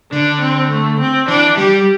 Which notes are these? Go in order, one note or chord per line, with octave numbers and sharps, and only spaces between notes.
D3 D4
C4
A3
C4
E3 D4
G3 G4